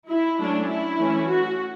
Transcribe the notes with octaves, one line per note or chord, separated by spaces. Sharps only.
E4
F#3 A3 C#4 D4
E4
E3 A3 C#4
F#4